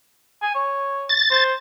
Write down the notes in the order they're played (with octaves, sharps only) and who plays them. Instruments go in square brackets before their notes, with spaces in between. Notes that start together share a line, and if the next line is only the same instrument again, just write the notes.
[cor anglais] G#5
C#5
[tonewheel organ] A6
[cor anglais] C5